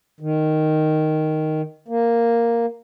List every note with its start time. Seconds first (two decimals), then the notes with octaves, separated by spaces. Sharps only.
0.20 D#3
1.88 A#3